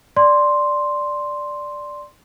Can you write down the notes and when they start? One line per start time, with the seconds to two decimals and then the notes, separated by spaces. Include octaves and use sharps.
0.17 D5 C6